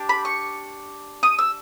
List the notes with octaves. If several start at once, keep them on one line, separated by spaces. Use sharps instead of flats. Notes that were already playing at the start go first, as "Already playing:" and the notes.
Already playing: D4 G4
B5
C#6
D#6
E6